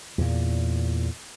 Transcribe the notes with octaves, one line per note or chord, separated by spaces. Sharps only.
E2 A#2